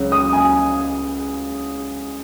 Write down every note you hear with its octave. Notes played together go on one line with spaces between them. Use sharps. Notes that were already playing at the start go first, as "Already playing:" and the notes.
Already playing: C#2 C#3 F#3
D#6
G#5